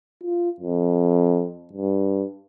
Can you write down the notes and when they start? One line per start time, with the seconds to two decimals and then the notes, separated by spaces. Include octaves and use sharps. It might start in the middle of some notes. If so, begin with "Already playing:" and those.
0.23 F4
0.60 F2
1.73 G2